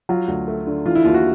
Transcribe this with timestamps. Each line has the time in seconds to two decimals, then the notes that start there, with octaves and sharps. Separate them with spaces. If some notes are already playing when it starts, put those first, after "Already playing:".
0.09 F#3 F4
0.28 D2
0.48 A3
0.67 D3
0.86 E3 F4
0.95 E4
1.05 D#2 F4
1.14 F#4